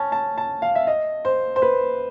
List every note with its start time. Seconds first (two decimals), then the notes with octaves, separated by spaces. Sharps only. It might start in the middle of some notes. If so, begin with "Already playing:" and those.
Already playing: C#4 A5
0.12 A5
0.38 A5
0.62 F5
0.75 E5
0.87 D#5
1.25 C5
1.56 C5
1.62 B4